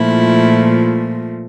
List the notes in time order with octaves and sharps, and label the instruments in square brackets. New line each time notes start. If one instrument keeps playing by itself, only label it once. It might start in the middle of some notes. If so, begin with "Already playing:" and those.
Already playing: [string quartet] A#2 F3 A3 E4